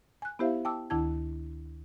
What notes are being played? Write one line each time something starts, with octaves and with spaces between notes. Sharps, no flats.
G#5 F#6
B3 E4 G4 C5 E5 F5
G5 A5 D6 E6
D2 D#3 D4 E4 A5 G#6